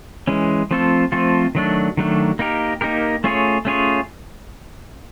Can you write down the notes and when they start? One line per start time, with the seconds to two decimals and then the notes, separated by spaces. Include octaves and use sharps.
0.27 E3 G#3 C#4
0.71 F3 A3 C4 F4 A4
1.12 F3 A3 C4 F4 A4
1.55 D#3 F#3 A3 D4
1.97 D#3 F#3 A3 D4
2.39 A#3 D#4 G4 A#4
2.81 A#3 D#4 G4 A#4
3.24 A3 C#4 F4 G#4 C#5
3.65 A3 C#4 F4 G#4 C#5